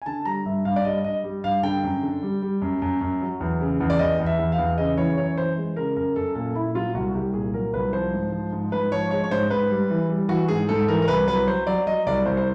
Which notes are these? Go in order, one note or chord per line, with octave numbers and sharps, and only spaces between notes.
G#5
D3 A5
G3 A#5
G2 E5
G2 F5
D5
G3 D#5
G2 D#5
G3
G2 F5
D3 G5
F#2
D3
G3
G3
F#2
F#2
F#2
F#3
E2
C#3
E2
D5
E2 D#5
E2
E5
E2
F5
E2
C#3 D#5
E3 C#5
F#2 C#5
E3 C5
G#3
C#3 A#4
F#2 A#4
F#2 A4
A#2 A4
A#2 E4
F#3 F4
C2 F#4
C2 G4
A#2 G#4
F#3 A#4
C2 B4
F3 C5
G#2
F3
G#2
G#2 B4
F3 C#5
G#3 C#5
C#5
G#2 C5
G#2 B4
G3
E3
G3
E3 F#4
G#2 G#4
G#2 A4
E3 A#4
A#4
C2 B4
F#3 B4
F#3 C5
F#3 D5
F#3 D#5
C2 D5
C2 C5
C5